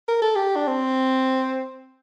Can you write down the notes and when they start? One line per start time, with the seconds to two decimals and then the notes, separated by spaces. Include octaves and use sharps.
0.08 A#4
0.22 A4
0.36 G4
0.56 D4
0.67 C4